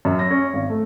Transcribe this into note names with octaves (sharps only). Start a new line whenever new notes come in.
F#2
A#6
C#4
G#1
A3